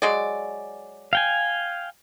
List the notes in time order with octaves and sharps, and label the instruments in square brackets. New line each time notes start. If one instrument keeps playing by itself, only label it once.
[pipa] F#3 G#3 D5
[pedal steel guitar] F5 G5 G#5